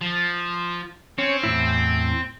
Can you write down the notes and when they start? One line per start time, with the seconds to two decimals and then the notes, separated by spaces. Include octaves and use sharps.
0.01 F3
1.18 C4 C#4 C#5
1.43 E2 A2 E4